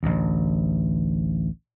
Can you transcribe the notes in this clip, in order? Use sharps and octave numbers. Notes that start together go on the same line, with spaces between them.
A1 D2